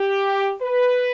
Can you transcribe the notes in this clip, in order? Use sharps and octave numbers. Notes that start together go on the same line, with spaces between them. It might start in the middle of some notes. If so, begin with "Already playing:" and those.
Already playing: G4
B4